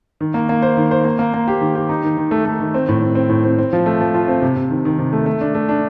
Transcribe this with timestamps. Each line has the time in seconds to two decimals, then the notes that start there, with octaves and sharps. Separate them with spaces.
0.21 D#3
0.34 A#3
0.49 A#3
0.62 C5
0.77 D#3
0.91 C5
1.05 A#3
1.19 A#3
1.34 A#3
1.48 G4
1.61 D#3
1.75 G4
1.89 D#4
2.03 D#3
2.17 D#3
2.31 A3
2.45 A3
2.60 D#3
2.74 C4
2.88 A2
3.02 C4
3.15 C4
3.29 A2
3.44 C4
3.58 C4
3.73 F3
3.86 A3
4.00 F3
4.14 F4
4.28 C4
4.42 C3
4.56 C3
4.70 D#3
4.85 D#3
4.98 C3
5.13 A3
5.26 A3
5.41 D4
5.54 A3
5.69 D4